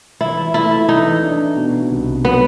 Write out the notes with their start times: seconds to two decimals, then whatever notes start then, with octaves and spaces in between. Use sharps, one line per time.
0.20 E3 E4
0.54 A3 E4
0.89 E3 D#4
1.23 D4
1.56 B2
1.90 C2
2.25 F#3 B3